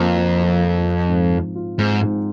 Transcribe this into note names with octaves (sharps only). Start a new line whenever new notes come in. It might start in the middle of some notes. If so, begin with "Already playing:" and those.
Already playing: F2 F3 A#3 F4
F3
F4
F3
C4
G#2
F3
F4
G#2 C4
G#2